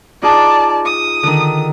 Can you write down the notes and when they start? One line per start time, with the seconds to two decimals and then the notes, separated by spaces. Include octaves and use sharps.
0.22 D#4 F4 G#4 D5 A5
0.85 D#6
1.23 D3 D#3